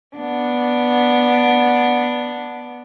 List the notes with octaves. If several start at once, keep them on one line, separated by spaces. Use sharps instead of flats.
B3 D4